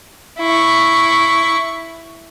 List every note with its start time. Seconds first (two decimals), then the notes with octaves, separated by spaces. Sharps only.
0.39 E4 C#6